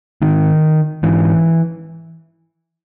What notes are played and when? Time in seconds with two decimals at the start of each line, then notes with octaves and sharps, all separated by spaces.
0.22 G#2 D#3
1.03 G#2 E3